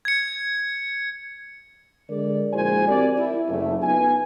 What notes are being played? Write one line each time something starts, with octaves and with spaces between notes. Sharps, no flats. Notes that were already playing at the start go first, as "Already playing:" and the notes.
G#6 C#7
D3 G#3 A#4 D5
A#1 G#3 E4 F#4 C5 G#5
C4 G4 A#4 D5
E4
F#1 A3
B3 D#4 F4 G#5